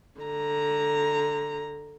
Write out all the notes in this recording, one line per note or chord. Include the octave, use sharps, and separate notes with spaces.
D3 A#5